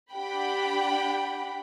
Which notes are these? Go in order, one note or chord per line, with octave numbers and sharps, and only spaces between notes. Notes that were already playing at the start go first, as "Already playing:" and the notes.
D4 G4 F#5 G5 B5